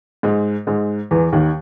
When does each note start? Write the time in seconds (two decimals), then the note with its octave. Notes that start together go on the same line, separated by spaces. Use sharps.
0.23 G#2 G#3
0.67 G#2 G#3
1.11 E2 E3
1.33 D#2 D#3